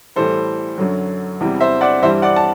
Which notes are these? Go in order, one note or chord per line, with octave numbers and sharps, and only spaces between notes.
A2 E3 G3 A4 C5
F#2 D3 F#3
E2 C3 E3 G3
C5 E5
D5 F#5
G2 E3 G3 C5 E5
D5 F#5
A5